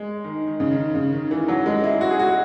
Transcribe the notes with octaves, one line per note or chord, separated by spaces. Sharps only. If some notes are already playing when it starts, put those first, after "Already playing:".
Already playing: G#3
D#3
D#3
C#3
D#3
C#3
D#3
E3
F#3
G#3
E4
F#4
G#4
F#4